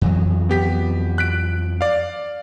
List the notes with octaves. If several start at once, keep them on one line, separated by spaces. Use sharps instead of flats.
F2 E3 F#3
B3 G4 B6
F#6 B6 D7
D5 F5